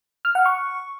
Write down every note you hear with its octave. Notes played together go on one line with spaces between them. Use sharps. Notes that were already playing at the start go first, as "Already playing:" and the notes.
F6
F#5
C#6